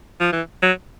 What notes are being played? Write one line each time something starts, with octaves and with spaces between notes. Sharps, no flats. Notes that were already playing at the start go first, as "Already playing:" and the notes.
F3
E3
F#3